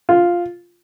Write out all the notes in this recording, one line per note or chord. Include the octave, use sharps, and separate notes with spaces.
F4